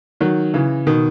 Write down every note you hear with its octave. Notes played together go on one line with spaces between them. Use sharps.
D#3 F#3
C#3 E3
B2 D#3